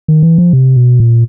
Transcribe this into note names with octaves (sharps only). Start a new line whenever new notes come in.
D#3
E3
F3
C3
B2
A#2